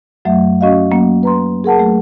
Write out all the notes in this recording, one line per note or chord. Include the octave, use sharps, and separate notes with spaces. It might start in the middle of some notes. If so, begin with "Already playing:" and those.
F#2 F#3 A3 E5
C#4 F#4 D#5 F5
F#3 A#3 C#4
B4 A#5 C6
G#4 A#4 F#5 A5
F#3 A3